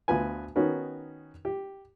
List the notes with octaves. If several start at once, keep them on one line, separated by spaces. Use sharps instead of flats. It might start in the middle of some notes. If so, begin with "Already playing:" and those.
D2 B3 F4 B4 G#5
D#3 B3 C#4 D#4 F#4 B4
G4